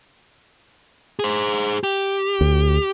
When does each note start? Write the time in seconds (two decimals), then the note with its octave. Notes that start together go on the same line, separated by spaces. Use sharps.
1.19 G#4 C5
1.84 G4
2.41 D2